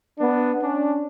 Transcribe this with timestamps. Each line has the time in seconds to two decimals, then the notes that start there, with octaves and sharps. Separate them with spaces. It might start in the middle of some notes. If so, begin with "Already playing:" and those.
0.18 B3 D4
0.62 C#4 D4